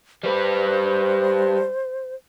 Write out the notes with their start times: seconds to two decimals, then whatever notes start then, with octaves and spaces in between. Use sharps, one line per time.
0.23 G3 B4 C5